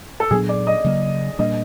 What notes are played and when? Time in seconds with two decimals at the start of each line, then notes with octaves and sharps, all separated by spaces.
0.20 A4
0.31 A#2 F#3 B3 D4 G#4
0.49 D5
0.67 D#5
0.84 C#3 F#3 A#3
1.39 A#2 G3 A#3 D4 D#5